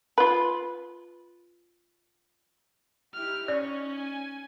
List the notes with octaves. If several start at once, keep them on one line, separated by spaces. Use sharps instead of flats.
F4 B4
D#4 E4 G4 F6
C#4 D#4 C#5 D5
G#5